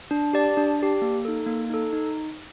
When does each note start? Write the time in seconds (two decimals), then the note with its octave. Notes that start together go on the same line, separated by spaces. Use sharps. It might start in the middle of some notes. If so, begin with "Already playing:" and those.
0.11 D4
0.33 G4 D5 A5
0.57 D4
0.79 G4 D5 A5
1.02 A#3
1.25 D#4 A4
1.46 A#3
1.70 D#4 A4
1.93 D#4